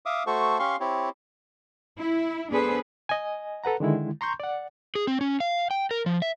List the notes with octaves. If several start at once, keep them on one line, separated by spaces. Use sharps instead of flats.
E5 F5 D6 D#6
A3 F#4 A4 C5 C#6
C#4 G4 F5 C6 C#6
C4 E4 G4 C#5
E4
B3 D4 G#4 A4 B4 C5
D#5 G#5
A4 B4 F#5 A#5
D3 D#3 G#3 E4
A#5 C6 C#6 G6
D5 F#5
G#4
C4
C#4
F5
G5
A#4
F3
E5